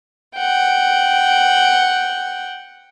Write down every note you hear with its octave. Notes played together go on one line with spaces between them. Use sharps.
F#5 G5